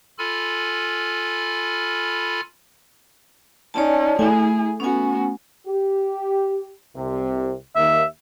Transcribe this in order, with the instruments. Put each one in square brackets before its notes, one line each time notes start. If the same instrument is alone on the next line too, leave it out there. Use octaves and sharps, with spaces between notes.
[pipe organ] F4 A4 G#5 B5 F6
[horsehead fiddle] C#4 D#4 [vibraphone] C#5 D5 A5
[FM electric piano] A3 [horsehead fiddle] E4 G#4 [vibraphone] G#5
[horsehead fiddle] B3 F#4 [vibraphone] C#4 G#5
[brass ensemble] G4
C2 C3
[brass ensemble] D#2 A#3 [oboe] E5